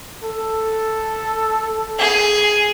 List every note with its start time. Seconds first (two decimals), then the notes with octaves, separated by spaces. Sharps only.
0.23 A4
1.99 G#4